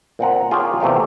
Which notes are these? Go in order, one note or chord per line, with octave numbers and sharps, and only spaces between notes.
A#2 C4 F#5 A#5
F4 G4 G#4 A#4 C#5
E2 C3 A3 G4 F5